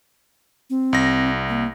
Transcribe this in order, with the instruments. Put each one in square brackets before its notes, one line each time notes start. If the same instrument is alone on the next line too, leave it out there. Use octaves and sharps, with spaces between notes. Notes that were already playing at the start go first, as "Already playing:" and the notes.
[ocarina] C4
[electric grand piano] C2 A#6
[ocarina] A#3